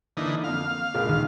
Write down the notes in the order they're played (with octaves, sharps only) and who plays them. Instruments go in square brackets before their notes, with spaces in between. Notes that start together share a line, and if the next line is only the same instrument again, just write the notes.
[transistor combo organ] D3 E3 D#4 [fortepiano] A#3
[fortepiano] F2 D3 [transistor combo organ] F5
[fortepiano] A#3
A#1 C#3 G#3
[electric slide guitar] D#3